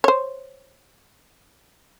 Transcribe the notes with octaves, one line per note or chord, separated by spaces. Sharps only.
C5 C#5